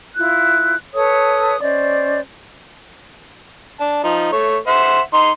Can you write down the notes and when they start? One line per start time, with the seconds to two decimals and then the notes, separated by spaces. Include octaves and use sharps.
0.15 E4 F4 F#6
0.94 A4 B4 C#5 D#6
1.61 C#4 C5 D5 D#5
3.80 D4 A5
4.04 F3 D#4
4.32 A3 C#5
4.67 C5 E5 F#5
5.13 D#4 C6